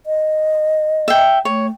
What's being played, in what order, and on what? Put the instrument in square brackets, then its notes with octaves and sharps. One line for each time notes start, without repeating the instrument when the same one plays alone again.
[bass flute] D#5
[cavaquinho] E5 G5
[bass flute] A3 [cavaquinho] C#5